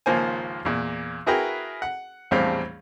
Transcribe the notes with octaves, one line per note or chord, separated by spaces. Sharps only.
G#1 C#2 F3 A#3 C5 G#5
E2 A#2
E4 F#4 G#4 A#4 B4 G5
F#5
A#1 E2 A2 G3 C4 F5